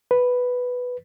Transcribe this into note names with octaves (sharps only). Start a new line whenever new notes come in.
B4